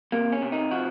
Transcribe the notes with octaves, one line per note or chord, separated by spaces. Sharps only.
C3 A#3
C#4
C3
D#4
F3 F#4